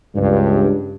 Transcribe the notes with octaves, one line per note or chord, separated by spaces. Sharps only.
C#2 G2